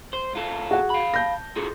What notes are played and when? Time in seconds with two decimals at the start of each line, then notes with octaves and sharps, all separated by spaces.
0.13 C5
0.33 C2 F4 A4
0.71 F#4 G#4 F#5
0.90 F5 B5
1.14 A5 G6 A#6
1.56 F4 G#4 A4